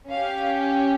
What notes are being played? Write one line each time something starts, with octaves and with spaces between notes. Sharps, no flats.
C#4 G4 F5